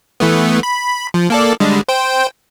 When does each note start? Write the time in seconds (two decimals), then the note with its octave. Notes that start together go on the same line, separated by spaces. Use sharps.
0.20 E3 A3 B3
0.63 B5
1.14 F3
1.30 A#3 A4 D5
1.60 D3 G3 G#3
1.89 C5 G5